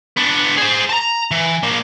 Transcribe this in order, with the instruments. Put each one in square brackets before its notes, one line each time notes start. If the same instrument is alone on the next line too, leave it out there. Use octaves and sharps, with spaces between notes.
[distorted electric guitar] B3 D4
G#4 C5
A5 A#5
E3
A#3 D4